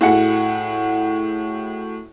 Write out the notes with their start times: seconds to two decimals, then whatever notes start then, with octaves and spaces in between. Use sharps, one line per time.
0.01 A2 E4 F#4 G#4 F#5 C#7